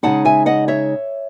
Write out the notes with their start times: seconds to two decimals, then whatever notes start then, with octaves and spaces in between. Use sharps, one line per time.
0.03 C#3 G#3 D#4 F#5 A5
0.25 E5 G#5
0.46 D#5 F#5
0.68 C#5 E5